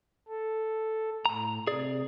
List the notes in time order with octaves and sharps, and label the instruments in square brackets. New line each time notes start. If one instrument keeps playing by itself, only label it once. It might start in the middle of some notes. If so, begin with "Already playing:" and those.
[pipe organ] A4
[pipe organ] A2 [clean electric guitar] A#5
[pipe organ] C3 [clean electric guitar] G#4 D5